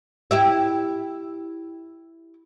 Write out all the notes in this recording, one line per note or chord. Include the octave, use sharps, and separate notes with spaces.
E4 G4 E5